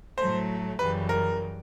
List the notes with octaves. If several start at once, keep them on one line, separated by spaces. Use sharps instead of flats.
A2 F#3 A3 C5
F#2 C#3 E3 G3 B4
A#4